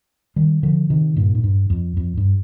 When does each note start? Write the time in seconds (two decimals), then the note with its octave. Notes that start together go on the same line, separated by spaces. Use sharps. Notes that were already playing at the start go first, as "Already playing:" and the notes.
0.36 D#3 G3
0.63 D3 F3
0.90 C3 D#3
1.16 G2 A#2
1.35 G#2
1.44 G2
1.70 F2
1.97 F2
2.17 G2